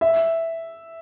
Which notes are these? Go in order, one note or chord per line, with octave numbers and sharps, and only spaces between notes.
E5